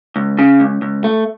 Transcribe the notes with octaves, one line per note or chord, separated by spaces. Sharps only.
C#2
C#3
C#2
C#2
A3